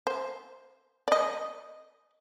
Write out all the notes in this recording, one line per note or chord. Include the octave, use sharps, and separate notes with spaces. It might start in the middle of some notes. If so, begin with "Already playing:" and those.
C5
D5 D#5